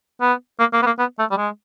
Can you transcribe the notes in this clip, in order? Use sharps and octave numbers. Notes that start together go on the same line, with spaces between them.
B3
A#3
A#3
B3
A#3
B3
A3
G3
G#3